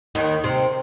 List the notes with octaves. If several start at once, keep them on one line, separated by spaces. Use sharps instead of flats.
D#2 D#3
C3 C4